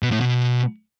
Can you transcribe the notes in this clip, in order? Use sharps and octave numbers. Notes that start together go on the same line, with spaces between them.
B2
A2
B2